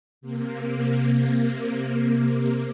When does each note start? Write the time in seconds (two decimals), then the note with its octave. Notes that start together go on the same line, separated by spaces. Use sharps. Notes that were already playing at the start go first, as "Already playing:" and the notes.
0.21 C3 A#3